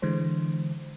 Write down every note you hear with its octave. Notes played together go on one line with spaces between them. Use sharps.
D3 E3 G#3 C5